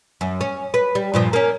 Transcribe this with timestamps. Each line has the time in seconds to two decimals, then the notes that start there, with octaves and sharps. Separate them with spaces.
0.21 F#2
0.41 C#4
0.74 B4
0.95 G3
1.14 G2 A#2 F3
1.33 A#3 C#4